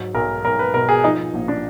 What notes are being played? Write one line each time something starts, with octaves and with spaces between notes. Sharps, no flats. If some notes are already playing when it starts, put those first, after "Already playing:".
Already playing: G#2 F#3
B1 A#4
B1 A#4
B4
B2 A#4
G#4
F3 D#4
A#1
D4